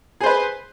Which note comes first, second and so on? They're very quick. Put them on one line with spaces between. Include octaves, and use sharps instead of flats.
G#4 C5 B4